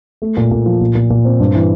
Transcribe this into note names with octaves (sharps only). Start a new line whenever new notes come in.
A3
A#2
A#2
F3
A#2
A#2
A#2
C4
G2
E3